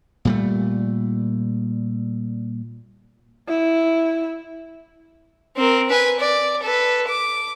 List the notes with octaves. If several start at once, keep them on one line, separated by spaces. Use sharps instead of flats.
A#2 G3 A3
E4
C4 A#4
B4 G#5
D5
A4 B4
D6